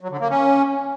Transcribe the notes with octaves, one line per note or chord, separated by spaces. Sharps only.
F#3
D3
A#3
C#4